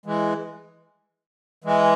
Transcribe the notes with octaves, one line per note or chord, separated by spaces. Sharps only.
E3 G#3
E3 G#3